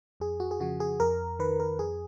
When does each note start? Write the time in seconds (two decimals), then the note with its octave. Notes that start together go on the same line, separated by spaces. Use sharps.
0.20 F2 G#4
0.40 F#4
0.51 G#4
0.60 C#3 F3 F#4
0.80 G#4
1.00 F2 A#4
1.39 D#3 B4
1.60 A#4
1.79 F2 G#4